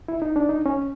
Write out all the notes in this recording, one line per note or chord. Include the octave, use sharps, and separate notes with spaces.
E4
D#4
D4
D#4
C#4